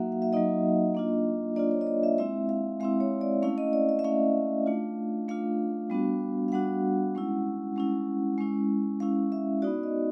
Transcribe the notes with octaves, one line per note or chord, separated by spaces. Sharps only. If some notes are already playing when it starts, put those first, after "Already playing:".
Already playing: F#3 A#3 D#4 F#4 E5 F#5
F5
E5
F#3 A#3 D#4 F#4 D#5
A#3 D4 F4
A#3 D4 F4 D5
C#5
D#5
D5
E5
G#3 C4 E4 E5
F5
G#3 C4 E4 F5
C#5
D5
A3 C#4 E4 F5
D#5
D5
D#5
E5
A3 C#4 E4 F5
A3 D4 F4
A3 D4 F4 F5
G3 B3 D4 F#4
F5
G3 B3 D4 F#4 F#5
G#3 C#4 E4
G#3 C#4 E4
G#3 C#4 E4
G#3 C#4 E4 F5
E5
B3 D#4 F#4 D5
D#5